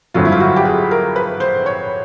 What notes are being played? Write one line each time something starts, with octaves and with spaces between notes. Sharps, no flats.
G1 F2 D3 F#3 F4
E4
F4
F#4
G4
G#4
A#4
B4
C5
C#5